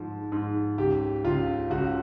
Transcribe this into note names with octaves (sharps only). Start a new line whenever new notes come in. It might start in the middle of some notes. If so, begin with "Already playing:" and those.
Already playing: G#2 F3
G#2
C#2 G4
C#2 F4
C#2 F#4